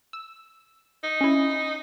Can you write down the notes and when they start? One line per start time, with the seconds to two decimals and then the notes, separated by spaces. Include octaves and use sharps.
0.13 E6
1.04 D#4
1.21 C#4 E4